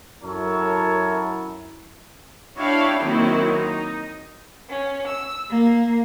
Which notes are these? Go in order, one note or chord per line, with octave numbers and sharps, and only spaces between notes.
F#2 E4 A4 A#4 C#5
D4 E4 F#4 C#5 F5 G5
D#3 F#3 A#3 C4 E4
D#4
C#4
E6
A#3